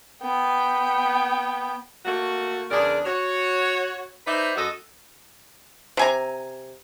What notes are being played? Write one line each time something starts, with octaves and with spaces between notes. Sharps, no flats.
B3 G5
A3 A#3 F#4
E2 C#3 D4 G#4 A#4 D5
F#4 C#5
D#4 B4 C5 D5 E5
F#2 F#4 A4 D#5
C3 G#5 A#5